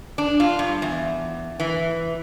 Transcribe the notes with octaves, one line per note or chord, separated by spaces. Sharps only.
D4
F4
G2
E2
E3